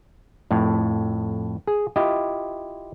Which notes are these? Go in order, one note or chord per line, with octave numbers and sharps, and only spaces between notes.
F2 A2
G#4
E4 F4 G4 D#5